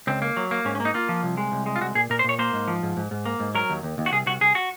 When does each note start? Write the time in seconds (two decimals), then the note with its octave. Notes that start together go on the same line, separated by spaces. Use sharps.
0.07 C#2 C4
0.22 A#3
0.37 F#3
0.51 A#3
0.65 G#2 C#4
0.75 C#4
0.80 A#3
0.85 D#4
0.94 A#3 F4
1.09 F3
1.23 C2
1.37 G#3
1.52 C2
1.66 G#3
1.76 F4
1.81 C2 F#4
1.95 A#2 G#4
2.10 A#2 A#4
2.19 C5
2.24 A#2 C#5
2.39 A#3 C5
2.53 G#2
2.68 F3
2.83 G#2
2.97 G#2
3.11 G#2
3.25 A#3
3.40 G#2
3.55 F#3 A#4
3.70 D#2
3.83 D#2
3.98 D#2
4.06 F#4
4.12 C2 G#4
4.26 C2 F#4
4.41 C2 G#4
4.55 F#4